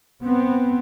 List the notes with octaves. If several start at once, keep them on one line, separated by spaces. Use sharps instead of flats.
B3 C4